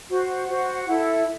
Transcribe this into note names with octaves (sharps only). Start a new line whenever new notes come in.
F#4 C5 F#5
F#4 C5 F#5
E4 A4 E5